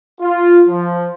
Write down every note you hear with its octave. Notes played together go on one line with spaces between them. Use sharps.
F4
F3